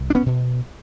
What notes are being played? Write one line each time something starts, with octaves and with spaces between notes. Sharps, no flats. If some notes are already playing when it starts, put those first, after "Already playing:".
Already playing: C2
D4
B3 C#4
B2